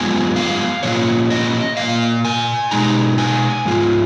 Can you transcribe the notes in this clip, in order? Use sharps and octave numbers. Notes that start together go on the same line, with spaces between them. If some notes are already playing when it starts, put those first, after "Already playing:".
Already playing: F#2 F3 G#3 B3 G#5
F5
A#2 F3 C#4 F4 C#5
D#5
A#2 F3 A#3 F5
G#5
B2 G#3 D#4 A#5
G#5
G#2 F3 B3 F4